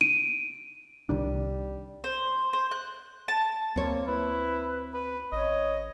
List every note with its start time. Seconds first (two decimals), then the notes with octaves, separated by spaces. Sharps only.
0.01 D7 D#7
1.09 C2 D#3 G3 D4
2.04 C5
2.53 C5
2.71 F#6
3.28 A5
3.76 D2 A#3 C4 C#5
4.07 E4 B4
4.93 B4
5.32 A1 C#5 D#5